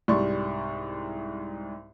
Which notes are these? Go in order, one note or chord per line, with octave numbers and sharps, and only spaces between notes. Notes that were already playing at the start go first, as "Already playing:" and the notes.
C2 G#2 G3 D5 C6 C#6